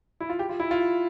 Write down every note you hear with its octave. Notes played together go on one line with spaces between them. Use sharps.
E4
F4
G4
F4
E4
F4